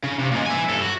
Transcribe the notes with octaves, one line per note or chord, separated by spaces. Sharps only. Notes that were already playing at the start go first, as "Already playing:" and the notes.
C#3
C3
A#2 G#3
E5 G#5
G2 A4
F#4